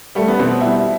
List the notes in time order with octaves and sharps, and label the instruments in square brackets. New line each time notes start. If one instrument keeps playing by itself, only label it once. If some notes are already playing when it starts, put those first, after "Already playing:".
[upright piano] G3 A3
B3
B2 C4
G3 E4